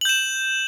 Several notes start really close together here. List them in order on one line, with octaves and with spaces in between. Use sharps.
F#7 G6 E7